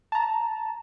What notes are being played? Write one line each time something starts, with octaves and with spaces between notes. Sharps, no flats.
A5 A#5